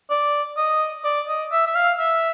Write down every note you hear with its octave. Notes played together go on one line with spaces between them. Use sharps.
D5
D#5
D5
D#5
E5
E5
F5
E5